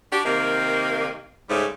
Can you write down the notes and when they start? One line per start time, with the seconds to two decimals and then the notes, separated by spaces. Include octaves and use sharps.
0.13 D4 F#4 G4
0.25 C3 D#3 A#3
1.49 G#2 C#3 G3 A3